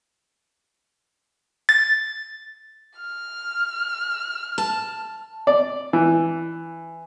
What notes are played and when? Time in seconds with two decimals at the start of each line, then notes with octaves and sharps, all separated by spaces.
1.69 A6
2.99 F6
4.58 A5
5.47 D5
5.93 E3